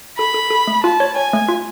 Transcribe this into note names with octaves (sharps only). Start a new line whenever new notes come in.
A4 B5
A4
A4
A3
F4 A5
C#5
C#5 G#5
A3
F4